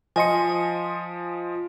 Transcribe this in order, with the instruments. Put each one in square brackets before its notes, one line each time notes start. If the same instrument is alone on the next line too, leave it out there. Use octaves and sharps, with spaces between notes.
[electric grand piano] F3 D#5 C6 [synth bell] G#5 C#7